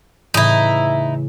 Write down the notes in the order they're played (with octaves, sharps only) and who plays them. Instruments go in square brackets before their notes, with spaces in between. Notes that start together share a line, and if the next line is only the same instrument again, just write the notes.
[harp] A2 C#3 E3 [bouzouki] D#4 E4